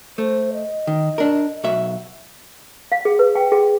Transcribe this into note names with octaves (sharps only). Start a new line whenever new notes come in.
A3 C5
D#5
D#3
D4 A#4
B1 F#4 E5
F5
G#4
B4
G5
G#4